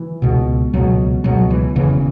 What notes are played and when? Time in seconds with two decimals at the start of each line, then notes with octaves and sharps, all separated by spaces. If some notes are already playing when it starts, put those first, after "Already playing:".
Already playing: E3
0.22 C#2 B2
0.73 C#2 B2 F#3
1.24 C#2 B2 F#3
1.51 E3
1.76 E1 E2 C#3 E3